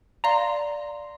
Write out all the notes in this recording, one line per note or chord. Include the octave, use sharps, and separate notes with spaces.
D5 F5 A#5 C6